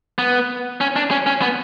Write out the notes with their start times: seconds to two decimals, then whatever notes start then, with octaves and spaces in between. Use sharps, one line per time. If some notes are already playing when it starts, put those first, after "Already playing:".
0.19 B3
0.81 C#4
0.96 D4
1.11 C#4
1.27 C#4
1.42 B3